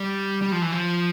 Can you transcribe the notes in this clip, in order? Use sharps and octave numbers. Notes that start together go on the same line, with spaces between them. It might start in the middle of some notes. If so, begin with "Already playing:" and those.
Already playing: G3
G3
F3
E3
F3